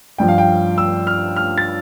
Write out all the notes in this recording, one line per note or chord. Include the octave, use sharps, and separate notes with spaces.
G2 F3 G5
F5
G5
E6
F6
F6
A6